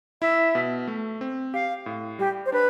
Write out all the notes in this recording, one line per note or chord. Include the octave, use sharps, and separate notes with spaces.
E4 E5
B2
A3
C4
G4 F5
A2
G3 G4
C5
D4 B4